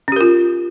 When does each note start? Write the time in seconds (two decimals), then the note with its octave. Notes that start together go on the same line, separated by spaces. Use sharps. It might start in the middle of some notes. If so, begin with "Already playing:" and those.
0.08 C#4
0.12 G4
0.16 A#4
0.21 F4